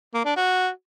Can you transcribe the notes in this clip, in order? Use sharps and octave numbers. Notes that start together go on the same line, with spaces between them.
A#3
D4
F#4